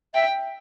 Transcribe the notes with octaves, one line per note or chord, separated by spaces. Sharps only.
E5 G5